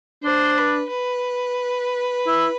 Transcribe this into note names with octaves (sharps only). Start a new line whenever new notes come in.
D4 C5
B4
B4
E4